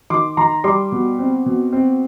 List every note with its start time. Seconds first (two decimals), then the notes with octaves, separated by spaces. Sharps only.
0.10 D#3 C6 D6
0.37 D#3 A#5 C6
0.64 G3 C6 D6
0.92 B2
1.19 C4
1.46 B2
1.73 C4